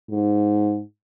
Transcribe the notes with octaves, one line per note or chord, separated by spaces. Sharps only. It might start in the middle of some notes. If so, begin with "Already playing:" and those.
G#2